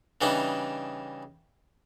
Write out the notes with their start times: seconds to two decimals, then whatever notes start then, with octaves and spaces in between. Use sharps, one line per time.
0.21 C#3 E3 G3 D4 D#4